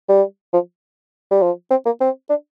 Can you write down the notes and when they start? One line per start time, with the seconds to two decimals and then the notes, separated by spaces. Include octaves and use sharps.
0.09 G3
0.53 F3
1.31 G3
1.42 F3
1.71 C4
1.85 A#3
2.01 C4
2.29 D4